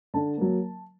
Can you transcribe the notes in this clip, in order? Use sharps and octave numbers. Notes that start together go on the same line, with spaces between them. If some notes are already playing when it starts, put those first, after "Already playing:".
D3 A5
F#3 A#3